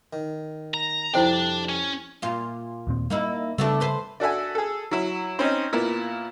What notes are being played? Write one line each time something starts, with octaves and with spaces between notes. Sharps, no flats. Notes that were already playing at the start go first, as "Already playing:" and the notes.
D#3
A#5
F2 C3 G3 D4 E4 C5 G5
C#4
A#2 F4
D#2 A#2 C4
G3 A#3 D#4 E4
C#3 G3 A3 B3 D4
E2 B4 C5
D4 F#4 A4 E5 G#5
G#4 A4
F#3 E4
C4 C#4 D#4
A#2 A#3 B3 E4